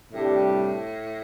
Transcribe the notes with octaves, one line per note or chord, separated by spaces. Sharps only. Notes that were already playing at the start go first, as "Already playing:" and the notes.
C2 A2 C3 G3 D4 G4